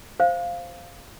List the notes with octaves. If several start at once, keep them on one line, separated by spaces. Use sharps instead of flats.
C5 F5